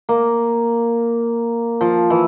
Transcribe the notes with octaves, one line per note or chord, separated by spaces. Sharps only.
A#3
F3
E3